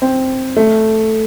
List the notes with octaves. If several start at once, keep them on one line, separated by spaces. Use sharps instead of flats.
C4
A3